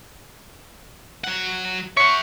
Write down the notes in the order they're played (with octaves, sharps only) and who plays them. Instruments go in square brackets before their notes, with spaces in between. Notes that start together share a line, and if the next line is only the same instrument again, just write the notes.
[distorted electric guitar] F#3 F#5
[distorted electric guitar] E5 F#5 [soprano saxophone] C#6